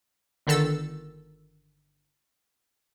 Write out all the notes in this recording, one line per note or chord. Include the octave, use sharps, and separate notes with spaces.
G1 D3 D#3 A4 E6 A6